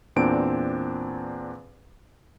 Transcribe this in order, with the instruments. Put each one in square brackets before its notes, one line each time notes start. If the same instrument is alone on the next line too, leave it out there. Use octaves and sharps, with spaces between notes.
[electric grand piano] E2 A#2 C4 D4 D7